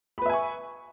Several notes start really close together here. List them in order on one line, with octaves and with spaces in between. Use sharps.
B5 B4 E5 G#5 C#6